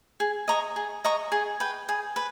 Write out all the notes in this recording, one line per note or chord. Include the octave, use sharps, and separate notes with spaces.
G#4
D#5 A#5 C#6
G#4
D#5 A#5 C#6
G#4
B4 G5
G#4
B4